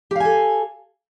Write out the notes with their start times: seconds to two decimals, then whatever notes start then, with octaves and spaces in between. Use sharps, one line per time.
0.11 G4
0.16 F5
0.20 G#5
0.25 A4